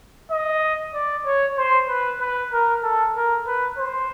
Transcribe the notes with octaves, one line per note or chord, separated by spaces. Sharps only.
D#5
D5
C#5
C5
B4
B4
A#4
A4
A#4
B4
C5